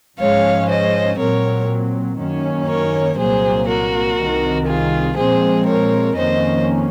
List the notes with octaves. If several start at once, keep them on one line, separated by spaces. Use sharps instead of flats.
G#2 F3 G#3 C#4 C#5 F5
C5 D#5
A#2 F#3 C4 A#4 C#5
F#2 D#3 A#3 C#4
A#4 C#5
C2 A#2 F#3 A#3 G#4 C5
F#4 A#4
C2 C3 D#3
F4 G#4
A#2 F3 G#3 C4 G#4 C5
A#4 C#5
F2 D#3 A#3 C#4 C5 D#5